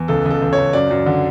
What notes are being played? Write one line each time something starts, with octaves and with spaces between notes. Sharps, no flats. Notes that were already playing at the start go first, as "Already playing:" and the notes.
Already playing: E2
C#2 A4
C#2 A4
C#2
C#5
C#2
F#2 D5
F#2
D3